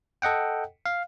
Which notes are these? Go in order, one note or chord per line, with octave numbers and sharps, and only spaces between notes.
A4 D#5 F#5 G5
F5